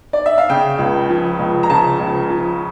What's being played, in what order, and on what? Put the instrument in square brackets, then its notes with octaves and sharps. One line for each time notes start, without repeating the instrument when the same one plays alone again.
[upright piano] D5
E5
F5
C#3 G5
C#2
F3
C#2
A#5
C#3 A5
C#2
F3